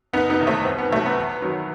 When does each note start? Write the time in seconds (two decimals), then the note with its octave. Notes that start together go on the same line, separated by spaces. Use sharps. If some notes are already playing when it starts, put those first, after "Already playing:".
0.13 F#1 B3 D#4
0.30 B3 D#4
0.39 E2 C3 D#3
0.47 A3 C4
0.65 C2 C4
0.78 B3
0.91 C3 F#3 A3
1.06 B3
1.16 E2
1.42 D#3 F#3